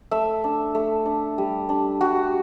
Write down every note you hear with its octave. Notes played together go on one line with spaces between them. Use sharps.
A3 E5
D4
A3
D4
G3
D4
G3 F#4